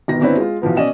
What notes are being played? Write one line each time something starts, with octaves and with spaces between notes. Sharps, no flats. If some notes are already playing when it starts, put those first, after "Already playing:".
G1 B2 D#3 A#6
G1 C4 D4 E4 B4 C#5
G#3 F4
B1 E3 F3 B3
B2 C#4 D5 D#5 E7